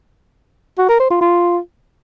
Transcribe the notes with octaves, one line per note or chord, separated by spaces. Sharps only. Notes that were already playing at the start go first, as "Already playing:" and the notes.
F#4
A#4
C5
F4
F4